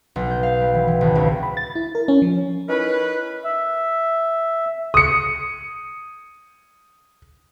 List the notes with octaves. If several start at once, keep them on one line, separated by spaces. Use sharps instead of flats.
B1
G6
F5
G3
E3
E3
G#1
C#2
B5
A6
E4
A#4
C#4
F3
C#4 D#4 E4 A#4 B4
E5
D#6 C#7